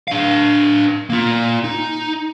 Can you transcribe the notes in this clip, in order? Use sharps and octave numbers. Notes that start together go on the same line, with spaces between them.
D4 F5
A#3 F4
D#4